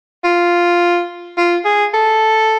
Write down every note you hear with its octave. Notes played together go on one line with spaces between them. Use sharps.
F4
F4
G#4
A4